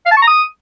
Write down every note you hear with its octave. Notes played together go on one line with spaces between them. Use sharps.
F5
A5
C#6
A#5
D#6